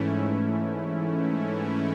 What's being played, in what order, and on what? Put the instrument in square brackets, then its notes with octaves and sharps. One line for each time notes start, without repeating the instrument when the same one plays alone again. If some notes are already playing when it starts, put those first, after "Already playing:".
Already playing: [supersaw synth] G#2 E3 A3 C#4 E4